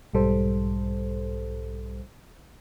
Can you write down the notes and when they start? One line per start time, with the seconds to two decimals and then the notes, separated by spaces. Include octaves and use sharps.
0.13 B1 G#2 G3 A4 C5